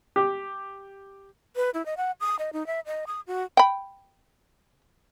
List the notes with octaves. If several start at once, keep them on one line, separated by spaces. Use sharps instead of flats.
G4
B4
E4
D#5
F#5
D#6
D#5
D#4
E5
D#5
D#6
F#4
G5 B5